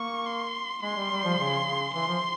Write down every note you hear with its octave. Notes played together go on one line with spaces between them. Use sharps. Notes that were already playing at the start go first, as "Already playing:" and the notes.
Already playing: A#3 C#6
C6
G#3 C6
G3
G3
F3
C#3
C#3
E3 C6
F3